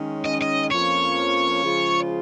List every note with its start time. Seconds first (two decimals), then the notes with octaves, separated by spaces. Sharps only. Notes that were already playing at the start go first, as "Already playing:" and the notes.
Already playing: D#3 G#3 C#4
0.26 D#5
0.42 D#5
0.71 F2 F3 A#3 C#4 F4 C#5
1.64 C#3 F3 G#3 F4